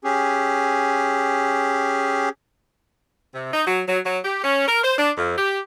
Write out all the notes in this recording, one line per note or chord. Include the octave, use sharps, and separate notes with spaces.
C#4 G4 G#4
C3
D#4
F#3
F#3
F#3
G4
C#4
A#4
C5
D4
F2
G4